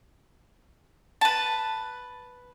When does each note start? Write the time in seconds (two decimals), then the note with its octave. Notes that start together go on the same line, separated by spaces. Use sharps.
1.21 B4 A5